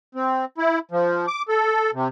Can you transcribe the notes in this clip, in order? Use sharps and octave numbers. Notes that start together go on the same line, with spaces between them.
C4
E4
F3
D6
A4
C3